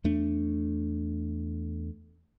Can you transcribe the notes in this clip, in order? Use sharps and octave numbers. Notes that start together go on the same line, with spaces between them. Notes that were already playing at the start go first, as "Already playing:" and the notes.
E2 A3 D4